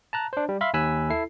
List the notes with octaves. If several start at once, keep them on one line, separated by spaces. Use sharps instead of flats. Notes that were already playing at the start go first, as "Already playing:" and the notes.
A5 A#5 F#6
D4 C5
G3
E5 F5 B5 C6
D#2 G#5 B5 E6 F#6 B6
E4 A4 C7